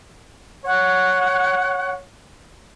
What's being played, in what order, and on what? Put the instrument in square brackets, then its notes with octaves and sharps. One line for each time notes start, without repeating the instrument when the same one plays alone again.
[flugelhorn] C#5 [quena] F#5